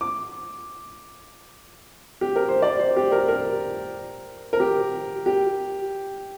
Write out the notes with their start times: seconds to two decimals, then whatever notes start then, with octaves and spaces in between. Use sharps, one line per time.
0.01 D6
2.21 G4
2.36 A#4
2.49 C5
2.62 D5
2.79 C5
2.96 G4
3.12 A#4
3.28 A#4
4.53 A#4
4.60 G4
5.26 G4